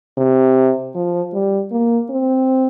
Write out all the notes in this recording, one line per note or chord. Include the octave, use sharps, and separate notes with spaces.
C3
F3
G3
A#3
C4